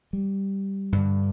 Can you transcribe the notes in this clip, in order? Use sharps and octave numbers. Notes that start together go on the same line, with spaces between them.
G3
G2 D3